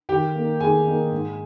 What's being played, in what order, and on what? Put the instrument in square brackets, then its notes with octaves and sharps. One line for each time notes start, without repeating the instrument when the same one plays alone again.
[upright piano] D#3 G4 G5
A#3 D#4
D#3 G#4 G#5
A#3 D#4
G#2